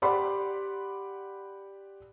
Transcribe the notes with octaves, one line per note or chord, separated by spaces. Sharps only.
G4 D5 F#5 B5 C6